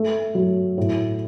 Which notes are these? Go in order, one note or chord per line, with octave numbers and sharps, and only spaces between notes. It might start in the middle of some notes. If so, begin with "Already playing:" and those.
Already playing: A3
F#3
A2